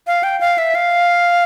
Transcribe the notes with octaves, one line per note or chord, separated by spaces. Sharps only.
F5
G5
F5
E5
F5